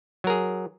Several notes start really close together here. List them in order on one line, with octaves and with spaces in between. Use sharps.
F#3 A#4 G#4